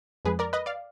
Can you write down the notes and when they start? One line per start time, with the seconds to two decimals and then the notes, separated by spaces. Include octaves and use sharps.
0.25 F2 F3 G#3 G#4 B4
0.39 A#4 D5
0.53 B4 D#5
0.66 D5 F5